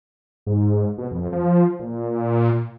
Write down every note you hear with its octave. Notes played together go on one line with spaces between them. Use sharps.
G#2
B2
F2
F3
A#2